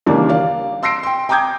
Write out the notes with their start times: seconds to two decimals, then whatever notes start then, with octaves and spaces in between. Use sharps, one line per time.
0.07 D#2 C#3 E3 G3 A#3 D4
0.29 D5 F5
0.83 C6 E6 A#6 C7 D7
1.03 G5 C6
1.29 G5 A#5 D6 D#6 G6 G#6